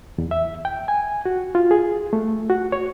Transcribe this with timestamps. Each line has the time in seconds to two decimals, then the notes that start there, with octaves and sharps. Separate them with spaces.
0.18 E2
0.31 E5
0.65 G5
0.88 G#5
1.25 F#4
1.55 F4
1.71 G#4
2.13 A3
2.50 F#4
2.72 C#5